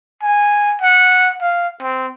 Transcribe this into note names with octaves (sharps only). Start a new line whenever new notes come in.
G#5
F#5
F5
C4